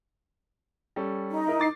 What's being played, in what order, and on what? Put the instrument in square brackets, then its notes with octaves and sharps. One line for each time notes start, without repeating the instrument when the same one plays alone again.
[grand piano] G3 C#4 A4
[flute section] D#4
[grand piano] E4 A#4
D6 A6 C7